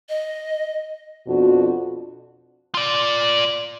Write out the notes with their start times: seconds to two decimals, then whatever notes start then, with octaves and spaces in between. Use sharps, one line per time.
0.09 D#5
1.28 F2 B2 F3 D4 F#4
2.74 F4 D5